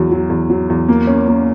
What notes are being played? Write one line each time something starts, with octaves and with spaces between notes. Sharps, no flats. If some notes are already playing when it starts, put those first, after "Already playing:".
Already playing: E2 F#3
F#3
E2
F#3
E2
A#3
C#4
A#3